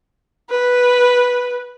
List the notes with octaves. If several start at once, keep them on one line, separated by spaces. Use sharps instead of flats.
B4